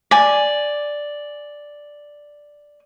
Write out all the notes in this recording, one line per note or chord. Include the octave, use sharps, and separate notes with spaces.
D5 G#5